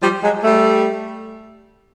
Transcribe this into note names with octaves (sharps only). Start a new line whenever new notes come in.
F3 G3
F#3 G#3
G3 A3